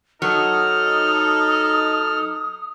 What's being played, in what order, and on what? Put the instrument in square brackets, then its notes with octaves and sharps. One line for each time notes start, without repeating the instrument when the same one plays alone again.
[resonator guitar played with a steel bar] F#3 [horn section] D#4 A4 [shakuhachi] D#6 [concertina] F6